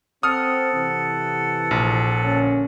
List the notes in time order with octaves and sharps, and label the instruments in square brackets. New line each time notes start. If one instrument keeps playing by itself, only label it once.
[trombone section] C4 [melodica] A4 F#5 [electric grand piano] D#6 F6
[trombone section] C3 E3
[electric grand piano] A#1
[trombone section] D3 A#3 C#4